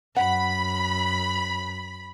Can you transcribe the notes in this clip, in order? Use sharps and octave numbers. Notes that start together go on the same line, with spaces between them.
F#2 F#5 B5